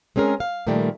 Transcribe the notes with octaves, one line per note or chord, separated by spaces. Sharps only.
G#3 C4 C#4 G#4 A#4
F5
A#2 D#3 F3 G3 A3 A#3